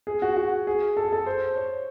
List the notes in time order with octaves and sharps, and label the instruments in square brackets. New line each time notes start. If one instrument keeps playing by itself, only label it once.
[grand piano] G#4
F#4
F#4
G#4
A4
G#4
A4
C5
C#5